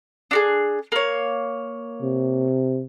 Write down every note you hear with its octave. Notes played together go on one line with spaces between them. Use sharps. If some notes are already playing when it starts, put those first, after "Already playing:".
D4 F#4 G#4
A#3 C#5
C3